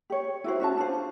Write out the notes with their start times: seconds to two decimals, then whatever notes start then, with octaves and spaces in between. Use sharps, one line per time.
0.10 G4 C#5
0.44 E4 F#4 C5
0.60 C#4 F#4 D#5 A5
0.77 D4 F4 C5